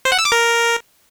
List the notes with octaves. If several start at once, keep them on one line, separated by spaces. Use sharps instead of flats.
C5
F#5
E6
D6
A#4